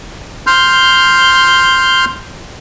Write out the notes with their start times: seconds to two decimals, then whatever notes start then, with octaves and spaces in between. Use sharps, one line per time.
0.47 C6 F6 G6